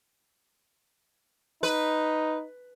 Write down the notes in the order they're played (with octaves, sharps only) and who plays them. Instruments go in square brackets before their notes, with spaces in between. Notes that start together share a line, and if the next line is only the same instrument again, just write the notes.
[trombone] D#4 [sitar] B4